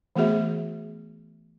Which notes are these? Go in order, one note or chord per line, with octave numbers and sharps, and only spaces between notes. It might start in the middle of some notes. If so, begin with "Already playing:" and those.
E3 A3 B3 F#4 G#4 E5